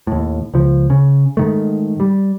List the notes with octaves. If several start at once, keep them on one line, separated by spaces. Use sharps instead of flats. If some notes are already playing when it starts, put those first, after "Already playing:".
D#2 A2
C#2 F3
C#3
G#2 D#3 A3
G3